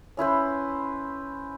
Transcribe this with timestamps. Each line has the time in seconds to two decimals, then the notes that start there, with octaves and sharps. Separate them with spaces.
0.17 C#4 E4 B4 C5